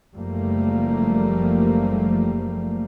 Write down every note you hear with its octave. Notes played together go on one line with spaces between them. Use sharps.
F#1 F3 G3 A3 A#3